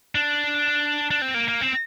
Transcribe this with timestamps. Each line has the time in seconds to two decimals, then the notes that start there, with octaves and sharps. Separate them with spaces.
0.15 D4
1.11 D4
1.22 C4
1.34 A#3
1.48 A#3
1.61 C4